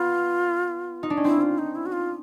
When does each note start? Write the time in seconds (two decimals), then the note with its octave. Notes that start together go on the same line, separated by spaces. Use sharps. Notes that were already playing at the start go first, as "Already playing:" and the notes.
Already playing: B3 F4
1.03 D#4
1.10 D4
1.17 C#4
1.24 C4 E4
1.41 F4
1.58 D#4
1.75 E4
1.86 F#4
1.92 F4